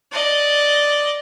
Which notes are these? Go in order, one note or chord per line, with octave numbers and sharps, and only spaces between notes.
D5 D#5